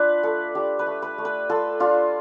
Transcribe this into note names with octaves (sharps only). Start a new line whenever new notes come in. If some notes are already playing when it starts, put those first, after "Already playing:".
Already playing: D4 F4 B4
A3 A4
D4 G4
B4
A3
B4
A3
B4
F4 A4
D4 F4